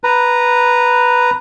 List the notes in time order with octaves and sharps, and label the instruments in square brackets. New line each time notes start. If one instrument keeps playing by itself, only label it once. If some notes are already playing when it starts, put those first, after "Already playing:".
[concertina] B4 A#5